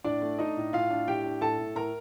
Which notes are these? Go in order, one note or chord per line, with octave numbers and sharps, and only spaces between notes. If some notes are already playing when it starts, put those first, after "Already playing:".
A2 D4 D5
A3
D4 D#4 D#5
A2
A2 F4 F5
D4
A2 G4 G5
D4
A2 A4 A5
A2
A2 A#4 A#5